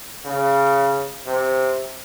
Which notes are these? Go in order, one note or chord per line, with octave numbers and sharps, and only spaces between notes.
C#3
C3